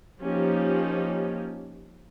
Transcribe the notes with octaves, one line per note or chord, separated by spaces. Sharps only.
F3 A#3 C#4 D#4 G4